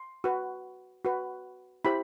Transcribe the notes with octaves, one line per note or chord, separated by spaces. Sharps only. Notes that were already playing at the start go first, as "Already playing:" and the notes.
Already playing: C6
F#4 B4
F#4 B4
E4 G4 C5 B5